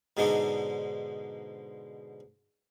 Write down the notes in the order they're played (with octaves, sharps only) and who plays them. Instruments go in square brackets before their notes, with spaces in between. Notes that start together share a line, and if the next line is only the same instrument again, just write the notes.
[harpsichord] G#2 B2 D3 G#3 D4 D#4